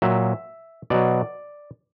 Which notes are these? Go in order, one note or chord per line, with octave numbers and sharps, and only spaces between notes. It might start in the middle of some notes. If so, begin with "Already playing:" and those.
A#2 F#3 E5
B2 F#3 D5